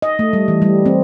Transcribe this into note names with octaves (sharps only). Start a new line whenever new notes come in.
D#5
A3
G3
E3
G3
C4